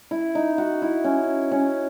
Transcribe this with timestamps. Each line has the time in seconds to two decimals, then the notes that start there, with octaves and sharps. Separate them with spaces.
0.11 E4
0.35 D#4
0.58 F#4
0.82 E4
1.04 C#4
1.52 C#4